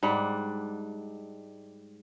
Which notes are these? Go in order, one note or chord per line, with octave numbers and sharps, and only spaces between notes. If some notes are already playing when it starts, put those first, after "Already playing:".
G#2 G3 D4 F#5